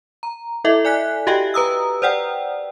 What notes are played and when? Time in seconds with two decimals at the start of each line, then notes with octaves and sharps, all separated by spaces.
0.23 A#5
0.64 E4 A4 D#5 E5
0.85 D5 G#5 F#6 B6
1.27 F#4 G4 D#5 F5 G5
1.54 B4 A#5 D#6 E6
2.02 C5 D5 F#5 G5